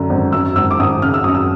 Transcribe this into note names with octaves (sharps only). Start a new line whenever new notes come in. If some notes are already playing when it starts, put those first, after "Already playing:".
Already playing: F#2 D3
G#1
F#2 E6
G#1 E6
D6
G#1 D#6
C#3 F6
E6
F#2 D#6
E6